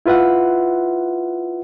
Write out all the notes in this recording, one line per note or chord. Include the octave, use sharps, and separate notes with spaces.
E4 F4 B4 E5 F#5